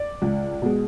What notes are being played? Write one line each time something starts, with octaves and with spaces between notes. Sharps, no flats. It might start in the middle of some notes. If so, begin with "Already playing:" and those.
Already playing: D5
C#2
B2 G#3